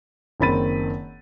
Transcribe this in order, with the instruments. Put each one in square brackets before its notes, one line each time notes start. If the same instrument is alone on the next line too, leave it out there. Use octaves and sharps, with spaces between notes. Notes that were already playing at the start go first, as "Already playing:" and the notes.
[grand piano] F#1 D#3 C4 B5 A6 D#7